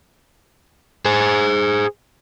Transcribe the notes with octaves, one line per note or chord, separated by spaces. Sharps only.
G#4 C5